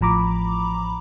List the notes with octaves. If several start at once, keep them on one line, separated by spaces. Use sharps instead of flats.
A1 A2 F3 A#5 B5 D6